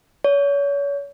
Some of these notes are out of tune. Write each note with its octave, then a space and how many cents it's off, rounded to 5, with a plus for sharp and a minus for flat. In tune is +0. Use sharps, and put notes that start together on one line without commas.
C#5 +35